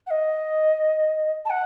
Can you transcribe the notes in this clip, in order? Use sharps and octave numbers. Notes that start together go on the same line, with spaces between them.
F#5
D#5
A5
F#5